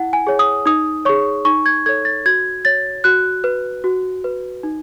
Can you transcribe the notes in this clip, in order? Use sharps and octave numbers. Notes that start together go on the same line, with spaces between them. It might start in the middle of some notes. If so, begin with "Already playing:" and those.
Already playing: E4 F#5
G#5
G#4 C#5
D#6
D#4 D#6
G#4 C#5 C#6
D#4 C#6
G#6
A4 C#5 G#6
A6
F#4 G#6
C#5 A6
F#4 F#6
B4
F#4
B4
D#4